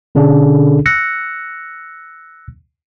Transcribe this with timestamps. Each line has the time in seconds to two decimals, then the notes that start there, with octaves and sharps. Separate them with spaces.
0.15 B2 D3 C#4 D4 G#4 A4
0.86 E6 F#6 A#6 C#7